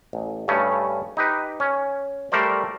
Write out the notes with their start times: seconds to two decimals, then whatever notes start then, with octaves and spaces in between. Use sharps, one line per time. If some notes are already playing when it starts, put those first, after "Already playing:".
0.13 A1
0.48 G2 C#3 A3 C#4
1.17 D#4 G4 B4
1.60 C#4
2.32 G3 A3 A#4 C5 D5